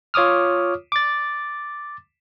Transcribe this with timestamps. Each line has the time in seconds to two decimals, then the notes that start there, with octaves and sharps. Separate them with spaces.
0.14 F4 C#5 D6 D#6 F6
0.92 D6 A6